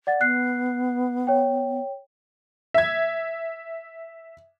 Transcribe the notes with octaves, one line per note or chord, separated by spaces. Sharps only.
D5 F#5 A6
B3 F#6 C7
C#5 G5
E5 G#6